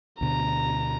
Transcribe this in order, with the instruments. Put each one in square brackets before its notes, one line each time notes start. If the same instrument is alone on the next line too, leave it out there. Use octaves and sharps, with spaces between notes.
[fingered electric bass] D2 B2 D3 [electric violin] A#5